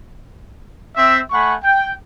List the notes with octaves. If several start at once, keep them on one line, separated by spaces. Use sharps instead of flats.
C4 E5
A3 F#5 G#5 B5 C#6
G5